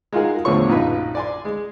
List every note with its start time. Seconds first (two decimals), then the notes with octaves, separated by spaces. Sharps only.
0.13 G#3 D#4 F4 F#4 G#4 A#4
0.45 E2 A2 D3 F3 C#5 C#6
0.69 A#1 F#2 D#4 F4 B4
1.15 D5 G#5 C6
1.45 G#3